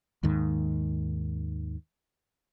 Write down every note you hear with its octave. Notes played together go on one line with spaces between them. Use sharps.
D#2 G#2 D#3